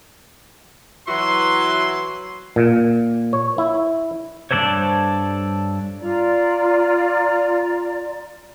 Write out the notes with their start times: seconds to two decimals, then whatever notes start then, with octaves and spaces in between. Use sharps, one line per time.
1.08 E3 F#3 E4 F#4 B4 C6
2.56 A#2
3.33 C#5
3.58 E4
4.51 G2 A#3 D4 A4 C5 C#5
6.01 F4 D5 A#5